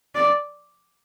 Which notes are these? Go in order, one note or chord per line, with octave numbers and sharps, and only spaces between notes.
D5